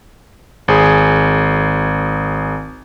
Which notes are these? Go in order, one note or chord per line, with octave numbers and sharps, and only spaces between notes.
G#1 G#4